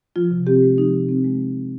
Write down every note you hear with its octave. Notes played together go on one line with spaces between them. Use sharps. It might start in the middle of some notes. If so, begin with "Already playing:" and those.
F3 F4
C3
C4 G4
G#3
F3 D#4
C3
C4
G#3